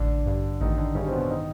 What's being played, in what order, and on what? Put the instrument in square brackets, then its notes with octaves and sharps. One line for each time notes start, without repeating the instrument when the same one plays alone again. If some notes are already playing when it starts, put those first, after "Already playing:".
Already playing: [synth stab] A1 [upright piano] D3 D4
[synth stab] G2
[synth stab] A1 [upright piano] D#3 D#4
[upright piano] D3 D4
[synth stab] G2 [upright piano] C#3 C#4
[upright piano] C4
B2 B3
D#3 D#4